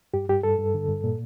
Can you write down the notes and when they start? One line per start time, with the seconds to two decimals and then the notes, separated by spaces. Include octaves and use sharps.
0.14 G2 G4
0.29 G2 G4
0.43 G2 A4
0.59 G2
0.74 D3
0.89 G2
1.04 A#2